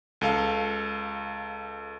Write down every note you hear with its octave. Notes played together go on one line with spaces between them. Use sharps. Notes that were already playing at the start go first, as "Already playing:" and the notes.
C#2 A4 F5 A5